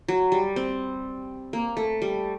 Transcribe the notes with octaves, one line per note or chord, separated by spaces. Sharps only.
F#3
G3
C4
A#3
A3
G3